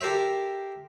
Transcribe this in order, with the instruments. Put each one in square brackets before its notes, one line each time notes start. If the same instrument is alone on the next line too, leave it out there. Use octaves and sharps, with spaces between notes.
[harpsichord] G4 A4 A#4 C5 E5